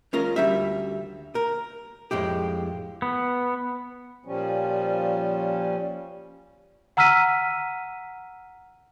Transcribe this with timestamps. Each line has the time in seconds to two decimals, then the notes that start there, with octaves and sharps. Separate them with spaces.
0.13 G#3 C#4 F4 A#4
0.36 D2 G3 E5
1.35 A#4
2.11 F2 A2 G#3 G4
3.02 B3
4.26 A#2 F3 G3 C#4
6.97 F#5 A#5 E6 F6 B6 D#7